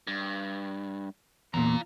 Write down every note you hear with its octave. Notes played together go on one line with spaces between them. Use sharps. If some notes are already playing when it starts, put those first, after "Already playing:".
G2
E2 A#2 F4 A#5